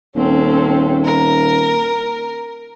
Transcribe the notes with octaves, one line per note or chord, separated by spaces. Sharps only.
D#1 C4 C#4 A4
A#4